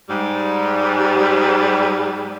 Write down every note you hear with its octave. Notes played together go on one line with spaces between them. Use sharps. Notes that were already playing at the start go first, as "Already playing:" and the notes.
G#2 G3